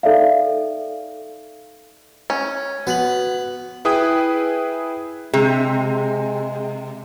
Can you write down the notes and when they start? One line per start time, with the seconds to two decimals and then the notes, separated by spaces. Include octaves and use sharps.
0.03 D#4 A4 D5 E5 F5
2.30 C#4
2.87 B3 F#4 F#7
3.85 E4 G#4 B4 G5 D#6
5.33 C3 G#3 G#4